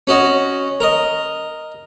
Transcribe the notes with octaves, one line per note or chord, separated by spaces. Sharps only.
C#4 F#4 D#5
A#4 D#5